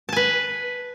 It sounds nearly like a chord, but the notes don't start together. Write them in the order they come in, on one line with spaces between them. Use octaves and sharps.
A5 G#5 B4